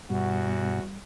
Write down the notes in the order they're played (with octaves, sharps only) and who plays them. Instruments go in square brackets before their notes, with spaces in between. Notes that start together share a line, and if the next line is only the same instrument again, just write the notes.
[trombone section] E2 F#4 [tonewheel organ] G2 B2 [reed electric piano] G3